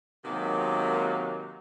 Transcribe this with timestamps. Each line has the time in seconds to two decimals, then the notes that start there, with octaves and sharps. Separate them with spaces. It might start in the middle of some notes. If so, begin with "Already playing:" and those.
0.25 C3 D#3 F#3 G#3 A#3 B3